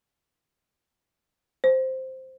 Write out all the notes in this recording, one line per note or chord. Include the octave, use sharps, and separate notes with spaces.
C5